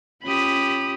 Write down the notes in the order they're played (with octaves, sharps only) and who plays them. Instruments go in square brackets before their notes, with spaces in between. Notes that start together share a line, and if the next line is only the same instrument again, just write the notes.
[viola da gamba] C#4 F4 G4 [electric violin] B5 D#6